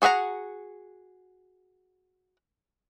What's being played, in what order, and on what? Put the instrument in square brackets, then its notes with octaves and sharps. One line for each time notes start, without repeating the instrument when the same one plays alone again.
[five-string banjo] F#4 G#4 E5 F#5 A#5